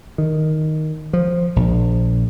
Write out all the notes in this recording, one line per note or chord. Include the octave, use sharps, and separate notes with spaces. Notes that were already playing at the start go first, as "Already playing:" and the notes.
D#3
F3
A#1